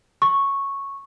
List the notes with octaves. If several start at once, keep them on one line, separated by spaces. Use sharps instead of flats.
C#6